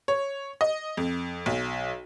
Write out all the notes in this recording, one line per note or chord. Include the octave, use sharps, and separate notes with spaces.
C#5
D#5
F2
B1